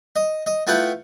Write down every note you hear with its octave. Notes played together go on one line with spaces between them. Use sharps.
D#5
D#5
A3 B3 E4 F4 F#5 G5